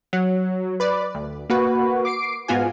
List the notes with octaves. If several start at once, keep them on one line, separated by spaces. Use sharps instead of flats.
F#3
B4 D5
D2
A#3 F#4 B4
D6 C7 D7
G#2 B3 F4 F#4 G#5